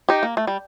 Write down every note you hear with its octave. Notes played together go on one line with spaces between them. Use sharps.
D#4 G4
A#3
A3
G3